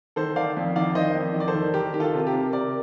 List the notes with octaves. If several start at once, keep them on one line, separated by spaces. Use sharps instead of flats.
D#3 A4 C5
D#3 D5 F5
F2
D#3 D5 F5
D#3 C5 D#5
F2
D#3
D5
A4 C5
D#3
D#3 G4 A#4
D#3 G4
F4 A4
C3
G4 A#4
C3
C3 A#4 D5